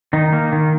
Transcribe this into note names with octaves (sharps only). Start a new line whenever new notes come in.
D#3 D#4
A#3
D#3